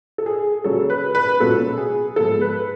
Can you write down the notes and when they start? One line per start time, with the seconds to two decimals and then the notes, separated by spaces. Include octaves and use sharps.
0.18 A4
0.26 G#4
0.64 C#3 F#3 C#4 A4
0.90 B4
1.15 B4
1.40 C#2 B2 F#3 B3 F4 A4
1.78 G#4
2.16 G#2 F3 G#3 B3 A4
2.41 B4